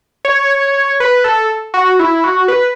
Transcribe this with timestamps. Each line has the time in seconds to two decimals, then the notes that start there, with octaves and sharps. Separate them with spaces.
0.25 C#5
1.00 B4
1.24 A4
1.74 F#4
1.99 E4
2.24 F#4
2.48 B4